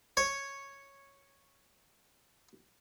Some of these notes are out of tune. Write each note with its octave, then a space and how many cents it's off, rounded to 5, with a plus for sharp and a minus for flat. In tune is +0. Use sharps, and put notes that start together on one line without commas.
C#5 -5